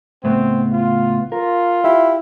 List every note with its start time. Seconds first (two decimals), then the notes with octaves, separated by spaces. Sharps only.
0.24 C#2 A2 B3 C4
0.72 F4
1.32 F4 A#4
1.84 E4 G4